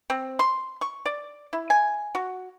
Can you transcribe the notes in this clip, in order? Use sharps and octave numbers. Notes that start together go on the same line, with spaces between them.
C4
C6
C#6
D5
E4
G#5
F#4